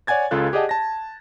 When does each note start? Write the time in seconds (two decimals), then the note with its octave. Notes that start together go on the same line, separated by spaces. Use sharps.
0.07 C#5 D5 F#5 G#5 G#6 A6
0.31 C#2 C#3 F4 A4 F#6
0.53 G4 G#4 D5 D#5 F#5 A5
0.69 A5 A#6